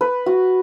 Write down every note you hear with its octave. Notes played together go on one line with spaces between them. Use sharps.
B4
F#4